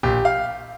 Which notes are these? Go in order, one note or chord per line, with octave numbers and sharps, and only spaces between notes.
A#1 G4
F5